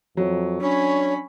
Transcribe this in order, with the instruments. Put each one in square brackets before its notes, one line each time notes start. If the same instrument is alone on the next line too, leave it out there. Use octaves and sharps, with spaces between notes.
[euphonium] F2 [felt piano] F#3
[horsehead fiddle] C#4 B5 [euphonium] D4 [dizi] C#5